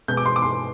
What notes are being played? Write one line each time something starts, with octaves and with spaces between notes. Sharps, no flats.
B2 G#3 B3 G6
D6
C6
D6
C6